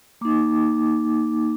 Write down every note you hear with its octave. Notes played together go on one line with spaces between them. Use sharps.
A#3 D#4 D6